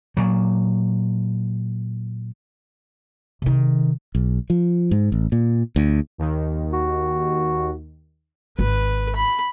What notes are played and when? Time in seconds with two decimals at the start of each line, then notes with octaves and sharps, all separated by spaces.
0.17 A#2 F#3
3.42 C3 D#3
4.15 B1
4.50 F3
4.91 G#2
5.12 A1
5.32 A#2
5.76 D2
6.18 D#2 D#3
6.73 F#4
8.59 G#1 B4
9.16 B5